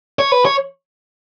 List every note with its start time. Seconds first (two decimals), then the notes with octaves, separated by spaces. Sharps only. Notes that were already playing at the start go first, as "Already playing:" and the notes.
0.19 C#5
0.32 B4
0.45 C#5